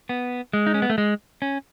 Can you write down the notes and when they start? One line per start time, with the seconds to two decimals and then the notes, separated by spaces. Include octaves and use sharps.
0.09 B3
0.53 G#3
0.67 D#4
0.74 C#4
0.82 B3
0.90 A3
0.98 G#3
1.42 C#4